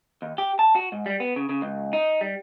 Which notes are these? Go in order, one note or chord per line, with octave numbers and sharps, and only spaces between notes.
D#2
G4
A5
F#4
G#2
G3
B3
C#3
C#3
C#2
D#4
G3